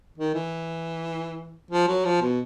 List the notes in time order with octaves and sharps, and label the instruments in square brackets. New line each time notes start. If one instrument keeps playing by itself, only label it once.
[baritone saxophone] D#3
E3
F3
F#3
F3
B2